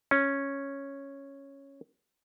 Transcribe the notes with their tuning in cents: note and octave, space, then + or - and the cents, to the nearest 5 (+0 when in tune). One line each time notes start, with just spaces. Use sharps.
C#4 -5